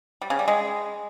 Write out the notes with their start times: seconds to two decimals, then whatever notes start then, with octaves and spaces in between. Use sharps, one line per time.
0.22 G3
0.30 C#3
0.39 G3
0.48 G#3